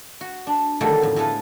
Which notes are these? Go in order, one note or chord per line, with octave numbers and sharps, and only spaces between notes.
F#4
D4
E2 D3 D#3 F#3 G3 A3
F2 A2
A2 G#3 E4 A4 B4 F5